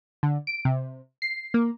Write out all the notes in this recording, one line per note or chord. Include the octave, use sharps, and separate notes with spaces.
D3
D7
C3
C7
A#3